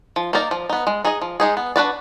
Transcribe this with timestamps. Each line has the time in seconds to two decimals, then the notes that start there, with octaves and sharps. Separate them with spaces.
0.16 F3
0.33 A#3 D#4 A#4 D5
0.51 F3
0.69 B3 D#4
0.87 G#3
1.05 D#4 G#4 D#5
1.22 F3
1.40 G#3 D#4 G#4
1.57 B3
1.76 D4 F#4 B4 D5